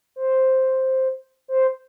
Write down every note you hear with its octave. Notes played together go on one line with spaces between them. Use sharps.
C5
C5